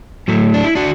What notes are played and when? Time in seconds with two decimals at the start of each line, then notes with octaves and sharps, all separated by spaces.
0.28 A2 F#3 A3
0.54 D4
0.64 E4
0.75 D4 F#4